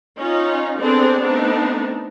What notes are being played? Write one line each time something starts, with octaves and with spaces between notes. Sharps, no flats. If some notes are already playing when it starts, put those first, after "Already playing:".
C#4 D#4 F4
B3 C4 D4 G#4 A4 D5
A3 B3 C4 D4 D#4